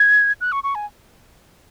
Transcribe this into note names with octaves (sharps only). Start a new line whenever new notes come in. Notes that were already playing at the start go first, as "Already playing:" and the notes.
Already playing: G#6
F#6
C#6
C#6
G#5